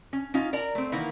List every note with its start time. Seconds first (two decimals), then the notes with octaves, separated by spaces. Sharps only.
0.13 C#4
0.34 C#4 D#4 F4
0.53 A#4 D5 A#5
0.75 A3 C4
0.92 D#3 E3 A#3 B3 E4